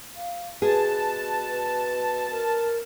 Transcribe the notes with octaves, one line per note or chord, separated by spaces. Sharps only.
F5
B2 G#4 B4 A5
A#4